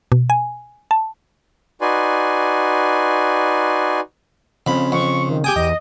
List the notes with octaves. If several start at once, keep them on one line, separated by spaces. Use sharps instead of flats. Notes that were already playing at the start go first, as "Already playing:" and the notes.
B2
G#5
A5
D#4 F#4 B4 D5 G#5 C6
F2 C#3 B5
F2 C#6
D#3
G4 G5 G#5 D#6
E2 D#5